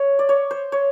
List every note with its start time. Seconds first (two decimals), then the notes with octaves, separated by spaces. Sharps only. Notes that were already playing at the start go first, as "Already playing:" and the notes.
Already playing: C#5
0.19 D5
0.29 C#5
0.51 C5
0.72 C#5